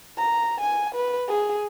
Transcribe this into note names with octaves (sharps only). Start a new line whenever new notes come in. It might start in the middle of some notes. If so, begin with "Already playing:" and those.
A#5
G#5
B4
G#4